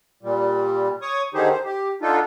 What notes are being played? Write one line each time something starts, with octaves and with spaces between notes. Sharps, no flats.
A#2 G3
C#5 C#6 D#6
D3 D#3 D#4 G4 G#4 C5
C5
G4
D3 D4 D#4 F4 A4